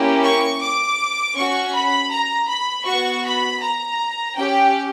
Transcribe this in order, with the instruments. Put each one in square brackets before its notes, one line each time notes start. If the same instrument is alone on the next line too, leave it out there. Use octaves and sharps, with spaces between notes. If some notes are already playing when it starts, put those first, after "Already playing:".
Already playing: [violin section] A#3 C#4 E4 G4
C#6
D6
C#4 F#4 C#6
B5
A#5
B5
B3 F#4 C#6
B5
A#5
C#4 G4 G5